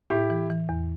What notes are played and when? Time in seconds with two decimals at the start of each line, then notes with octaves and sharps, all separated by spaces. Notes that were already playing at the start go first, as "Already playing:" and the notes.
0.10 A2 E4 G4
0.30 E3
0.50 E3
0.69 E2